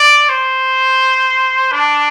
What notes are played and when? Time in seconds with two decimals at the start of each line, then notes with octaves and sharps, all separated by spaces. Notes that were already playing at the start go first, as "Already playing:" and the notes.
Already playing: D5
0.29 C5
1.72 D4